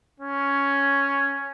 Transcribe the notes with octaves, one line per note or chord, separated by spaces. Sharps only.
C#4